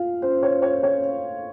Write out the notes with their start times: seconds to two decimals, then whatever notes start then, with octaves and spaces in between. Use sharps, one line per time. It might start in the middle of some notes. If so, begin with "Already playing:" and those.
Already playing: F4 F5
0.22 C#4 C5
0.43 C#5
0.62 A4 C#5
0.83 C#5
1.04 F5